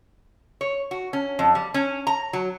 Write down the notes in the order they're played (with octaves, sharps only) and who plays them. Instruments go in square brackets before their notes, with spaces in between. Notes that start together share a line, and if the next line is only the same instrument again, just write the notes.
[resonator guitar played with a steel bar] C#5
F#4
C#4
F2
G3
C#4
A#5
F#3